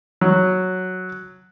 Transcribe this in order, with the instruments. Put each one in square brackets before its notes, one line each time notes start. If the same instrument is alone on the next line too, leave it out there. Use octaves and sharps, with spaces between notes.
[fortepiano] F#3